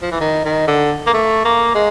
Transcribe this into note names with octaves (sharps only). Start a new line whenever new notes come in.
F3
E3
D#3
D#3
D3
A#3
A3
A#3
G#3